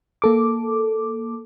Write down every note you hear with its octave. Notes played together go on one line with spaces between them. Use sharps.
A#3 A4 D6